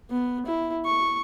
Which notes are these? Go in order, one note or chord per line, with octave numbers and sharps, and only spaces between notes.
B3
E4
C#6